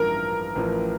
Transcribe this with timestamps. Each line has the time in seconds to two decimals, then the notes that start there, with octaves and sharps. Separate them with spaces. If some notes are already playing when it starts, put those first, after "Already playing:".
Already playing: A1 G2 F3 A3 E4 A#4
0.55 A1 A2 F3